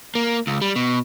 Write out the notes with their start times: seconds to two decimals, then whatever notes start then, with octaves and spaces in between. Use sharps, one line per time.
0.15 A#3
0.47 C#2
0.61 G3
0.76 B2